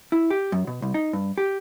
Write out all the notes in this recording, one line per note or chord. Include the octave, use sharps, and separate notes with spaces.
E4
G4
F#2
B2
C2
D#4
G2
G4